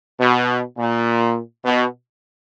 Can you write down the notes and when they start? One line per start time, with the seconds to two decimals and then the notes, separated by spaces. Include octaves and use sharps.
0.20 B2
0.77 A#2
1.65 B2